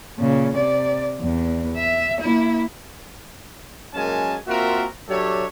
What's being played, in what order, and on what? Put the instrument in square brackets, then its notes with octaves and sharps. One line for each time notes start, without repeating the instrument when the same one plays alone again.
[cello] A#2 C#3
C3 D5
E2
E5
A#3 E4
[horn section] F#2 G#3 A#3 C#4 G#5 A5
A#3 C4 F4 F#4 A#4 E5
F#3 D4 G4 A4 C#5 E5